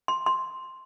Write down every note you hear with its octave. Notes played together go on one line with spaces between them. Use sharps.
C6
C6